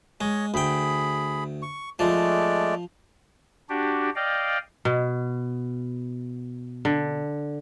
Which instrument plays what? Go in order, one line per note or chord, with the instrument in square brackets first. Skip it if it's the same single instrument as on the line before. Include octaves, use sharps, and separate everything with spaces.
[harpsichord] G#3 [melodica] C#5 D#5
[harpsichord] D2 G5 [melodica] G#4 B5
[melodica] C#6
[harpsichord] F3 [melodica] G#3 A3 D5
[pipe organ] D4 F#4 G4
D5 D#5 F5 G5
[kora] B2
D3